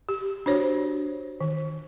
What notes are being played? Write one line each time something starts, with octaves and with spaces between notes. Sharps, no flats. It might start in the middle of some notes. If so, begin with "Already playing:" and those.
G4
D4 F#4 C5 C#5
D#3